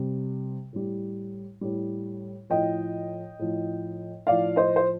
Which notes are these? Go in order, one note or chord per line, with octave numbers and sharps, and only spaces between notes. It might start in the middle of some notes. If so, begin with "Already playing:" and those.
Already playing: C3 G3
A2 G3
A2 G3
A2 F3 D#5 G5
A2 F3
A2 F3 D5 F5
C5 D#5
C5